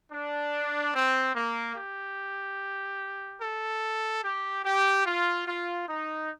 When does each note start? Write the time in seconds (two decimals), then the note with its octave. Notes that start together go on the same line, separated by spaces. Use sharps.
0.11 D4
0.94 C4
1.34 A#3
1.76 G4
3.41 A4
4.23 G4
4.64 G4
5.05 F4
5.47 F4
5.87 D#4